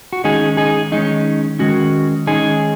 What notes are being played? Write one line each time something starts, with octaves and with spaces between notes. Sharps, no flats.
F#4
D#3 G#3 C#4 D#4 G#4
D#4 G#4
D#3 G#3 C#4 D#4
D#3 G#3 C#4 F#4
D#3 G#3 C#4 D#4 G#4